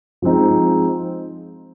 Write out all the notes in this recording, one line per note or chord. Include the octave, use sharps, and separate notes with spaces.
F3 G#3 C4 D#4